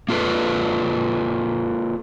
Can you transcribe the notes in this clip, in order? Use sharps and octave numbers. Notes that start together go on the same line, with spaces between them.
A#3 F4 A4 B4